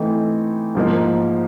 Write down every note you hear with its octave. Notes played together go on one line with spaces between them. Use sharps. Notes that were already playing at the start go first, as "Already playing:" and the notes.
Already playing: E3 A3 C4 D#4
G#2 F3 A#3 D#4